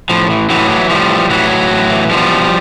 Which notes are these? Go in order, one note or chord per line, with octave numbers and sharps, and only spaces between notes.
A2 F3
E3
A2 E3 F#3
E3
A2 F3 G3
E3
A2 E3 F#3
E3
A2
E3
B2 F3 G3
B2